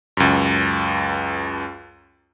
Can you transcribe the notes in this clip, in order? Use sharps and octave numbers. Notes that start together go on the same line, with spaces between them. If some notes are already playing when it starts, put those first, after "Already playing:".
C#2 F#2